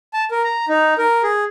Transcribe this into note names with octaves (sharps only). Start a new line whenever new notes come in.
A5
A#4
A#5
D#4
A#4
G#4